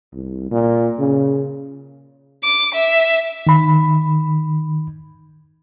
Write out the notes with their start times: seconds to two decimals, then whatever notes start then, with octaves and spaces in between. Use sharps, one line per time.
0.14 C2
0.51 A#2
0.99 C#3
2.43 D6
2.75 E5
3.47 D#3 B5